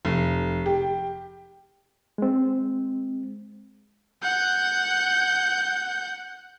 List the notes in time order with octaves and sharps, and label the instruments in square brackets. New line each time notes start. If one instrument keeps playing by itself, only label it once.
[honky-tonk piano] F1
G4
[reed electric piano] G#3 C4
[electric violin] F#5 G6